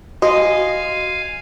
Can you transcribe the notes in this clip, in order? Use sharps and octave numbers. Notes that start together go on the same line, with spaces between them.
F#4 D#5 F5 G#5